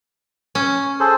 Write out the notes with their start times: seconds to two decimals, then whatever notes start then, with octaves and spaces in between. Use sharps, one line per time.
0.55 C#4
1.00 G#4 A4 C5